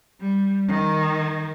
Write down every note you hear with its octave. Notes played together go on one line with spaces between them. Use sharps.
G3
D#3